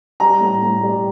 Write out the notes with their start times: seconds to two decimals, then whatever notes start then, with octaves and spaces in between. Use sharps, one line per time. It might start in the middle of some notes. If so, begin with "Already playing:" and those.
0.20 G3 A#5
0.41 A2
0.63 A2
0.84 G3